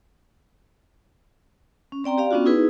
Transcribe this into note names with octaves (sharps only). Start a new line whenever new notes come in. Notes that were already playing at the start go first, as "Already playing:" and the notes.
C#4
C4 D5 G5 A#5 C6
G4 D5 F5
B3 C#4 D4 F4 F#4
D#4 E4 G#4 B4